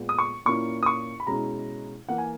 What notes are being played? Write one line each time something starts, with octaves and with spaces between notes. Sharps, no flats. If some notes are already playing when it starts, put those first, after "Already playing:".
Already playing: A#2 G#3 B3
D#6
C#6
A#2 A#3 C#4 E4 C#6
D#6
C#6
B5
B2 G#3 C#4 E4 A#5
E3 A#3 E4 F#5
G#5